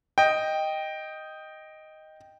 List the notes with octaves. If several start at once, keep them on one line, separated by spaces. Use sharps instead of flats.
D#5 G5